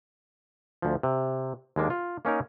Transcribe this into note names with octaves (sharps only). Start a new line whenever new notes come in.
D2 F3
C3
D#2 G#3 A#3 D4
F4
A#3 C#4 D#4 A#4